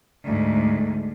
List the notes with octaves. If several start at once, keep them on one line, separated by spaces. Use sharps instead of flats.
D2 G#2